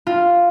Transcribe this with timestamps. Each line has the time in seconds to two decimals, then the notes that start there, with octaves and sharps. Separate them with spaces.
0.07 F4